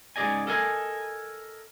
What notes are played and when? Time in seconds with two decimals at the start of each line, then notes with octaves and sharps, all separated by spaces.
0.16 G#2 C#3 G#4 D5 D#5 G#5
0.47 A4 A#4 D#5 G#5